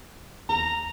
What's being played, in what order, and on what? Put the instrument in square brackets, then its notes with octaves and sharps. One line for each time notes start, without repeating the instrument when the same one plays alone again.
[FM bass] D#2 [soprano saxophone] A#5